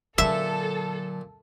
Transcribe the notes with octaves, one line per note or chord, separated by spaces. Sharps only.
A#2 D3 F#3 A4 E5